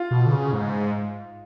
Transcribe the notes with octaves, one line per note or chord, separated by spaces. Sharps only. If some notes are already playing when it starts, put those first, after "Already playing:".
Already playing: F4
B2
D3
C#3
G#2